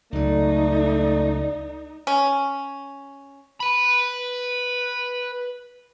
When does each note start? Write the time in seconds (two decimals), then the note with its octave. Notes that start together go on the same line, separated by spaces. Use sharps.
0.12 C#2 F#3 A3 D#4 D5
2.07 C#4
3.60 B4 B5